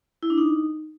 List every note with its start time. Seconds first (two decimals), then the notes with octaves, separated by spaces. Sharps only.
0.23 E4
0.30 D4
0.38 D#4